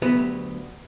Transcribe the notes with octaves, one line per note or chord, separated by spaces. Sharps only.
D2 F#3 B3 G4 B4